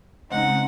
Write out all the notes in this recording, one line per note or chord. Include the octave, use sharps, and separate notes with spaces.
C#3 G#3 C4 D#4 F#5